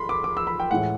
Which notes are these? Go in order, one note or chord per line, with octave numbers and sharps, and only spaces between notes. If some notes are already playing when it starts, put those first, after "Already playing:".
Already playing: B5 C6
D6
D6
E6
B5
G5
A2 E3 G#3 F#5